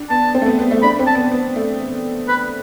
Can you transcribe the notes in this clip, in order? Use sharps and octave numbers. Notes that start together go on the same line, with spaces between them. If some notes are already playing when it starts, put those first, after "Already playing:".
Already playing: D4
B3 A5
C4
A3
B3
B3
A3
D4 B5
C4
A5
B3
B3
A3
B4